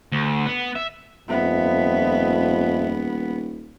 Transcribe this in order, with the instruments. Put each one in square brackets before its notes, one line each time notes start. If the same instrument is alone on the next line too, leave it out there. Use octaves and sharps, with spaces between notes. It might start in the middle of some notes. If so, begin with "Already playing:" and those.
[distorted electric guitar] D2
B3
E5
[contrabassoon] D#1 [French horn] F2 [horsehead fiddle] B3 [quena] E5